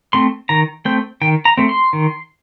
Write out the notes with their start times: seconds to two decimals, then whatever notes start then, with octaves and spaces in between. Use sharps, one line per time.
0.13 A3 C4 C6
0.49 D#3 A#5
0.85 A3 C4 G5
1.22 D#3 G5
1.45 A#5
1.57 A3 C4
1.69 C6
1.93 D#3